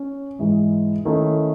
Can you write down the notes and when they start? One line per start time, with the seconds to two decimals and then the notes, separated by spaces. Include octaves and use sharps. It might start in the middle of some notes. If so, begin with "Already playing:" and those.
Already playing: C#4
0.39 G#2 E3 G#3
1.05 D#3 A3 C#4 E4